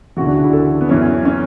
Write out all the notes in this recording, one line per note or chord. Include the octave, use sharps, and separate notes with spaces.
D2 C#3 E3 F#4
D4
F#4
E4
A4
B3
F#2 E3 C#4
C#4